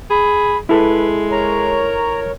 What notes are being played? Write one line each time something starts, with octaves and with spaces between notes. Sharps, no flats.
G#4 B5
G#3 E4 A4 B4
A#4 C#5 A#5